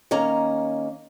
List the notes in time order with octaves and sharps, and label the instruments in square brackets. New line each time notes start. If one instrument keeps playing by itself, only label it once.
[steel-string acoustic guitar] D#3 A#3 C#4 A#5